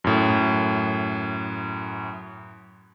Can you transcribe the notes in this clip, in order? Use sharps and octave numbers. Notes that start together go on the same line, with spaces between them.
F#2 A2